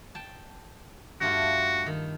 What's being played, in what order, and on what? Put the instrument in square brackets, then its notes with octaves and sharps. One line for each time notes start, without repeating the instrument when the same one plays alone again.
[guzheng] G5 A5
[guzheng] G2 A3 F4 [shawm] F#4
[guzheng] D#3 A4